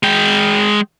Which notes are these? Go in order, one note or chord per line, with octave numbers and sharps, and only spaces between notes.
G#3 G5